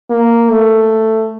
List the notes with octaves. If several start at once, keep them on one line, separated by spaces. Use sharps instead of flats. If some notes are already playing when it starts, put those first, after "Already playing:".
A#3
A3